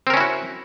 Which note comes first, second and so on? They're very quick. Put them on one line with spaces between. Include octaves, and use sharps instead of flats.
C4 A#4 C#4 E4 F#4